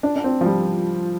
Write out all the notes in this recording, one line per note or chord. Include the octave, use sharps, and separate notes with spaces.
D4
D4
C4
F3
G3